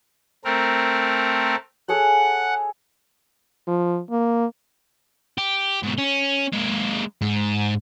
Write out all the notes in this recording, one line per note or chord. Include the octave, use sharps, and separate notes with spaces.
A3 C4 A#4
G#4 A4 C#5 F#5
F3
A#3
G4
G#2 B2
C#4
G#3 A#3
G#2